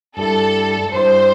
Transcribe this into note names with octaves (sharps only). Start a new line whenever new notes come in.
G2 G3 E4 A4
G2 G3 E4 C5